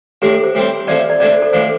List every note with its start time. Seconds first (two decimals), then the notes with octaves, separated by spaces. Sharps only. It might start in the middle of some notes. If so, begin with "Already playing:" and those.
0.22 A2 A3 D4 G4
0.33 A4
0.43 C5
0.55 A2 G3 C4
0.88 C3 F3 A3 D5
1.10 D5
1.20 C3 A3 D4 D5
1.32 C5
1.42 A4
1.53 A2 F3 D4 C5